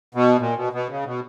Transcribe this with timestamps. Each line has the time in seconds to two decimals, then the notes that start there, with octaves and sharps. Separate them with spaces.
0.15 B2
0.39 A#2
0.56 B2
0.73 B2
0.89 C#3
1.05 B2